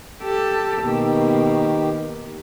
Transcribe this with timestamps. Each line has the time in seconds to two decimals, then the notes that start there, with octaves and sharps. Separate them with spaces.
0.22 G4 A4
0.83 B2 D#3 A#3 G4